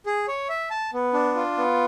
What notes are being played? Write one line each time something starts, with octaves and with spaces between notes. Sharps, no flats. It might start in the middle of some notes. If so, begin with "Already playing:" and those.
G#4
C#5
E5
A5
B3
D4
F4
B3